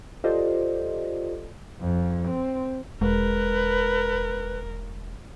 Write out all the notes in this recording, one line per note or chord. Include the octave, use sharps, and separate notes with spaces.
F4 G4 A4 C5 D5 D#5
F2
C4
E1 G#3 A#4 B4